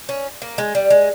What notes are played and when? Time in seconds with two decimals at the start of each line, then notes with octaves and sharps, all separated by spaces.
0.09 C#4
0.42 A#3
0.58 G#3
0.75 G3
0.90 G#3